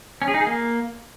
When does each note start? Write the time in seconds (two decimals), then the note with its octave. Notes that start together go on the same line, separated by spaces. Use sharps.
0.22 C#4
0.28 G#4
0.34 D#4
0.40 G#4
0.47 A#3